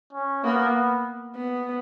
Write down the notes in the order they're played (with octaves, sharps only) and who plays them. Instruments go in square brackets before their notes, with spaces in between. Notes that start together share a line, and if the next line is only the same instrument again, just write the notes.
[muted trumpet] C#4
[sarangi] A#3 [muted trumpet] B3
[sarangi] B3